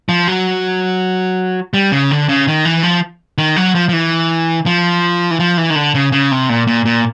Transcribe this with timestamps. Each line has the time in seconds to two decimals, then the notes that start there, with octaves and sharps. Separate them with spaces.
0.09 F3
0.28 F#3
1.74 G3
1.92 C#3
2.11 D3
2.29 C#3
2.48 D#3
2.65 E3
2.83 F3
3.38 D#3
3.56 F#3
3.75 F3
3.89 F3
3.93 E3
4.66 F3
5.31 E3
5.40 F3
5.58 E3
5.70 D#3
5.75 D3
5.95 C#3
6.12 C#3
6.31 C3
6.49 A#2
6.67 A#2
6.85 A#2